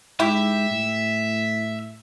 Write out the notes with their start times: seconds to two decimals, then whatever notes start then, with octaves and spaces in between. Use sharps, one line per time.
0.20 G#2 E4 G4 E5
0.71 A2